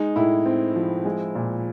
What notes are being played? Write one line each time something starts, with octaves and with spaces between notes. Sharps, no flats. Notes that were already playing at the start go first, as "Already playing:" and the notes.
Already playing: G#3 D#4
A2 E4
C4
F3
G#3
A#2